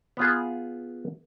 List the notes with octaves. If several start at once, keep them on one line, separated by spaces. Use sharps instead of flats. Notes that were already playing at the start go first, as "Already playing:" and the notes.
B3 F4 G#4